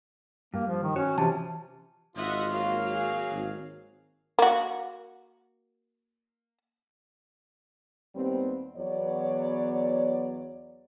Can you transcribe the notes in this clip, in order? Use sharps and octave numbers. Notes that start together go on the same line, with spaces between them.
G2 A#3
F3
D#3
C#4 F#4 C#5
C3 E3 F3 A5
G#1 F4 D#5 E5 F#5
F#3 A#3 F5
G#4
G#1
A#3 F#4
D#2 G3 B3 C4
E2 F#3 B3 C#5 D5